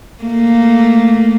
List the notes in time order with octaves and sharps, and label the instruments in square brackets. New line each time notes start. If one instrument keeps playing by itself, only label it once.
[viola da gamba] A3 A#3